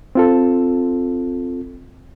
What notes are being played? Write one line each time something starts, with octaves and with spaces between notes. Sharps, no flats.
C4 F4 A4